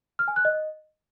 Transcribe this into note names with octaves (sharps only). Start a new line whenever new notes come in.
F6
G#5
F#6
D#5